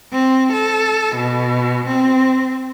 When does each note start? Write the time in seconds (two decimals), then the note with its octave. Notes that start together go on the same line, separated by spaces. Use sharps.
0.12 C4
0.53 A4
1.15 B2
1.87 C4